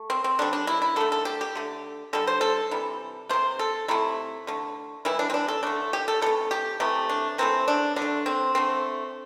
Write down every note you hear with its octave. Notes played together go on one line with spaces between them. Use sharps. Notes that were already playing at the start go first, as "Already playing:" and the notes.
Already playing: A3
C4
C4
D3 G3 D4
D4
E4
E4
D3 A3 A4
A4
G4
G4
D3 A3
D3 G3 A4
C5
A4
C3 E3 G3
C3 A3 C5
A4
C3 A3 E4
D3 A3
C3 E3 G3 E4
D4
C4
D4
A4
D3 A3 D4
G4
A4
C3 E3 A3 A4
G4
C3 E3 A3 G4
D4
C3 E3 A3 C4
D4
D3 D4
A3
C4
D3 A3 C4